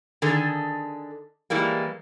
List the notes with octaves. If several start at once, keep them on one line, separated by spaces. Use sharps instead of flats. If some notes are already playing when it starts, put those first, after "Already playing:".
D3 D#3 G#4 A4
E3 G3 G#3 A#3